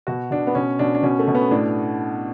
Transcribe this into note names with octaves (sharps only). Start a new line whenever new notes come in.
B2 F#4
B2 D4
B3
B2 C#4
B2 D4
D4
B2 C#4
A3
B2
B3
A2 D4